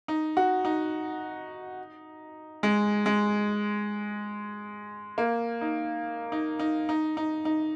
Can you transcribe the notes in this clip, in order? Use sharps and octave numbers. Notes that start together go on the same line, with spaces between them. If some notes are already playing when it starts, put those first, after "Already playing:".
D#4
F#4
D#4
G#3
G#3
A#3
D#4
D#4
D#4
D#4
D#4
D#4